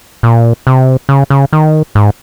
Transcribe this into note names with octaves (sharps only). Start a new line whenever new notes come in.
A#2
C3
C#3
C#3
D#3
G#2